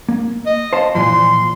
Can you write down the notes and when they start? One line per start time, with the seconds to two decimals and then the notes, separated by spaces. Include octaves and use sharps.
0.09 A#3
0.46 D#5
0.73 C5 F5 A5
0.95 A#2 E3 F3 C6